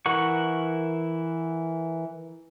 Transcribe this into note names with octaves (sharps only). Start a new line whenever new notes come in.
E3 E4 A#4 F#5 C#6